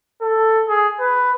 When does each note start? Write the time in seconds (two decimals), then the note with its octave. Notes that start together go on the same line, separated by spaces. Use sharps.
0.22 A4
0.68 G#4
1.00 B4